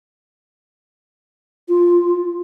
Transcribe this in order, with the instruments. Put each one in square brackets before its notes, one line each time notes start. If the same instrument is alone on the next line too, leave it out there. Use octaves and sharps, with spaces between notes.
[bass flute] F4